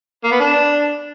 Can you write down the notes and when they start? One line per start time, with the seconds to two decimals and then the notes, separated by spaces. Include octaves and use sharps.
0.24 A#3
0.32 B3
0.40 D4